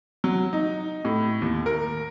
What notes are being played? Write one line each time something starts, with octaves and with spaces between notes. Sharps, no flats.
F#3
D#4
A2
D#2
A#4